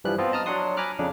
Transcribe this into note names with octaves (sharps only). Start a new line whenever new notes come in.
G2 E3 F3 G3 F#6
F3 B3 C4 F4
D#5 A5 A#5 D#6 F6
F#3 D4 F#4 F#5 C6 D#6
G#5 A#5 B5 D6 F6 F#6
F2 C#3 D4